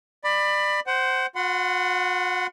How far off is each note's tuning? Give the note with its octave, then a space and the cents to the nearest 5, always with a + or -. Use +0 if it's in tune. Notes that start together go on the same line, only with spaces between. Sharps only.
D5 +25 B5 +5
C5 +0 F#5 +25
F#4 -45 F#5 +0 C6 -35